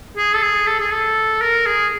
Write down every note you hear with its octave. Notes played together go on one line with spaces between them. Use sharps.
G#4
A4
G#4
A4
G#4
A4
A#4
G#4